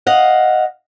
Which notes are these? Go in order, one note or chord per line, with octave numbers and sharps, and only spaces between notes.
D#5 F5 F#5